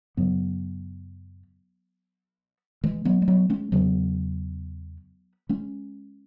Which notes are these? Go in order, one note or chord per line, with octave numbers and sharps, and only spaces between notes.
F#2 C#3 F#3 B3
E3 G#3
F#3 B3
G#3
F#3 B3
G#3 C#4
E2 C#3 F#3 B3
G#3 C#4